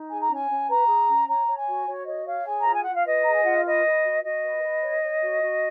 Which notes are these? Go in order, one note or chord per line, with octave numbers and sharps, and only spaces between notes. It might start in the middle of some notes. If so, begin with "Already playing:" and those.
Already playing: D#4
G#4 G#5
A#5
C#4 G#5
C#4
B4 A#5
G#4
C#4
C#5 A#5
C#5
G#5
F#4
F#4 C#5
C#5 D#5
C#5 F5
G#4 G#5
A#5
F4
G#5
F4 F#5
F5
B4 D#5
G#4 A#5
G#5
F4 F#5
F5
B4 D#5
B4
F#4
F#4 D#5
B4
B4
C#5
C#5
F#4
F#4